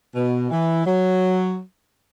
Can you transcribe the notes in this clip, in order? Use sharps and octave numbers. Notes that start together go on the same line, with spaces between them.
B2
E3
F#3